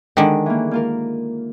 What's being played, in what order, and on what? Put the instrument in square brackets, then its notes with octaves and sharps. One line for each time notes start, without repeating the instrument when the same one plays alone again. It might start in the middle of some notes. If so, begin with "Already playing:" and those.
[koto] D3 D#3 [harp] G#3
[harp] E3 A#3
A#3 F4 A#4